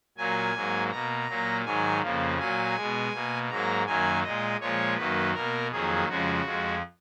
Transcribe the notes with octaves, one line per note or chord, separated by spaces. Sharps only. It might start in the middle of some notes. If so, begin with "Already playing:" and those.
A#2 F#3 A#3 G#5
G#2 F#3 A#3
B2 A#3 A#5
A#2 F#3 A#3
G#2 D#3 F#3 G#5
F2 C#3 F3 A#3
A#2 F#3 A#3 G#5
B2 G#3
B2 A#3
G#2 F#3 A#3 A#5
F#2 D#3 F#3 A#3 G#5
A#2 G#3 D#5
A#2 F3 G#3 C#5
F#2 D#3 F#3 A#3 B4
B2 A#3 A#4
F2 D#3 F#3 A#3 G#4
F2 C#3 F3 G#3 F#4
F2 F3 G#3